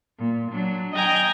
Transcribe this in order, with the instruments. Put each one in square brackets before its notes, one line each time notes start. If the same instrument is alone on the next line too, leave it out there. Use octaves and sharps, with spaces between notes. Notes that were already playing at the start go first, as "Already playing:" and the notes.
[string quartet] A#2
F#3 D4
D#5 G5 G#5 A#5 G6